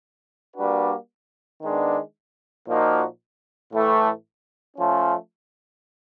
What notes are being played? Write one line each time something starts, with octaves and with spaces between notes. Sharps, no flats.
G3 A#3 D4 F#4 B4
D#3 G#3 B3 D4
A#2 F3 A#3 D#4 F#4
A2 E3 A3
F3 A3 C#4